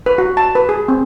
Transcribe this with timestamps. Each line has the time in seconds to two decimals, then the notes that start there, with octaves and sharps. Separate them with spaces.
0.06 B4
0.18 F#4
0.37 A5
0.55 B4
0.69 G#4
0.88 C4